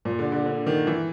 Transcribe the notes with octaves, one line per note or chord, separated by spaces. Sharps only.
A#2
D3
D3
D3
D#3
E3